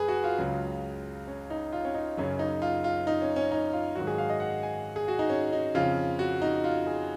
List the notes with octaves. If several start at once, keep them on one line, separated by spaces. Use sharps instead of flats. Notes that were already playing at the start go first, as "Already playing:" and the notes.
Already playing: F#2 G#4 B4
F#4
F4
C#2 C#3 F#3
C#4
D#4
F4
C#4
D#4
F#2 C#3 F#3 C#4
D#4
F4
F4
D#4
C#4
C#4
D#4
F4
G#2 D#3 F#3 F#4
G#4
F5
D#5
F#5
G#5
G#4
F#4
D#4
C#4
D#4
F2 C#3 F3 F4
F#4
D#4
F4
G#4